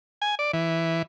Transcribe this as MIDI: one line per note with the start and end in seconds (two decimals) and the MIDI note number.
0.22 0.35 80
0.39 0.52 74
0.53 1.02 52